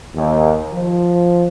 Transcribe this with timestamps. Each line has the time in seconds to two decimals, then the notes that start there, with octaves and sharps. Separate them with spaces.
0.15 D#2
0.74 F3